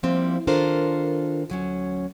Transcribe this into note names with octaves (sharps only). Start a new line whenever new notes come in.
F3 G3 A#3 C4 E4
D#3 D4 F4 A4 A#4 C5
D2 F#3 C#4